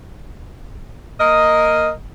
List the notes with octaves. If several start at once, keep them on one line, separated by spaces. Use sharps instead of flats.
A#3 A#4 D#5